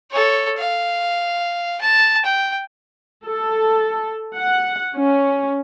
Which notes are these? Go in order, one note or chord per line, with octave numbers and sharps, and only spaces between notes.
A4 C#5
F5
A5
G5
A4
F#5
C#4